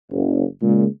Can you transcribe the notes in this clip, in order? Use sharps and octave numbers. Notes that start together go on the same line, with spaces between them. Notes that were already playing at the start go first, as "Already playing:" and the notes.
F#1
A#2 C#3 G#3